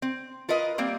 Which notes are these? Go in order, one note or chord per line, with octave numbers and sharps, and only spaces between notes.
C4
F4 A#4 B4 D#5
G3 A#3 C4